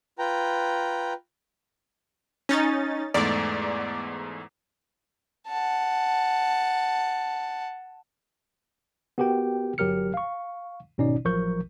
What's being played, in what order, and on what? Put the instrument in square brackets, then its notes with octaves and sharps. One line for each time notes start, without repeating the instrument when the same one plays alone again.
[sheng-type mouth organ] F4 B4 G5 A#5
[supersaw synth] C#4 D#4 A6
[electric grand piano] E2 G#2 A3 [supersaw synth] D5
[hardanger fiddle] F#5 A5
[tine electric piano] B3 F#4 G4 A#4 G5
G1 F#3 G4 A#4 F6 C#7
F5 C#6
G#1 B2 C#4 D#4 D5
A1 F3 F#3 A#4 C#6 G6